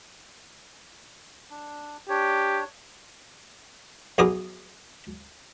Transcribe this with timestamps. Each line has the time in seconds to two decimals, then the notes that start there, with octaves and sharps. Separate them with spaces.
1.50 D4
2.09 D4 G4 C#5
4.18 B1 B2 B3 G#4 A#4 D6